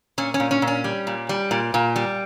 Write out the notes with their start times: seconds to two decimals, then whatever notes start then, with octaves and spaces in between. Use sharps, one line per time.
0.18 A#2 C#4
0.34 C#4
0.40 A#2
0.51 C#4
0.62 A#2
0.68 C#4
0.84 G3
1.07 A#2
1.29 G3
1.51 A#2
1.74 A#2
1.96 G3